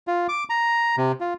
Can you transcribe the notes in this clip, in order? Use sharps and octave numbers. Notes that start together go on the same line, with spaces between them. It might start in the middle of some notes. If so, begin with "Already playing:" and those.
F4
D6
A#5
C3
F4